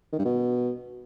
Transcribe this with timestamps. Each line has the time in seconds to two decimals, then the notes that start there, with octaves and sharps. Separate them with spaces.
0.12 D#3
0.19 G2
0.25 B2